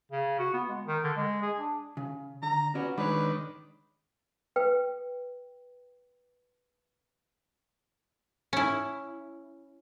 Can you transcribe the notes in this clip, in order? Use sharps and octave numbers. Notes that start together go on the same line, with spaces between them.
C#3
F#4
B3
G#3
D#3
D3
G#3
G#4
D4
C#3
D3 A#5
B3 C#4 F#4 D5
D#3 G#3 D4 B4 C#5
B4 G5
C#4 E4